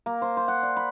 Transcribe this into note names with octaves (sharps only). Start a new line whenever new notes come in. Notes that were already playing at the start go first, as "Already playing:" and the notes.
A#3
C5
C5
F#5
D5
B5